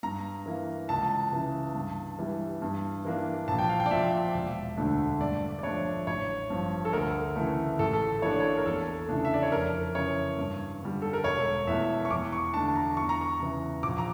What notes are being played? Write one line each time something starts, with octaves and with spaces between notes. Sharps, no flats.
G2 A#5
E3 A#3
C#2 A5
C#3 E3
G2
E3 G3
G2
E3 A#3 D4
A#1 A5
G5
F5
G5
D5
A#2 F3 E5
E1
D2 D3 A3 D4
G2 D5
D5
F3 A3 D4 C#5
A1 C#5
G2 F3
A4
D2 A#4
C#3 E3 A3
A1 A4
A4
A2 E3 A#3 D4 C#5
D5
C#5
A#4
E2 A4
C#3 E3 A3 D4
E5
D5
C#5
F2 A#4
C#3 E3 C#5
G2
D3 G3
A4
A#4
E1 C#5
E2 E3 A3 E5
C#6
E2 D6
C#6
D3 A3 D4 A5
A#5
E2 C#6
A#5
C#6
C#3 E3
A#1 D6
A#5